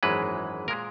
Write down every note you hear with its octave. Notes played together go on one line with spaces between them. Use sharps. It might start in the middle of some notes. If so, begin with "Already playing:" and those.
G#1 F#2 E3 G#3 B4
A#2 G#3 A#4